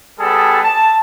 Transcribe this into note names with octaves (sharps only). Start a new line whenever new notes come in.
G3 B3 G#4 A4 A5
A5